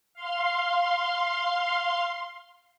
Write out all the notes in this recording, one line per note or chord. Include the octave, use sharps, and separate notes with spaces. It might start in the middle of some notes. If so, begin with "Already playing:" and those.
F5 C6